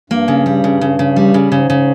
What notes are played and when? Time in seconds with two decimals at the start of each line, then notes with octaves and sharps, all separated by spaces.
0.10 G2 A#3
0.28 C#3
0.46 G3
0.64 C#3
0.81 C#3
0.99 C#3
1.16 G3
1.34 C#3
1.52 G#2 C#3
1.70 C#3